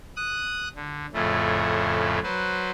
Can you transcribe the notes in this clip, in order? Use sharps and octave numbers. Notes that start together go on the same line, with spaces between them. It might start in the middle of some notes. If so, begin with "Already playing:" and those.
D#6 F#6
D3
F2 A2 C#3 A3
F#3 B4 C5